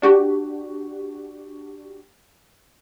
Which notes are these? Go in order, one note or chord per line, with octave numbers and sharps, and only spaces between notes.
D4 F#4 G4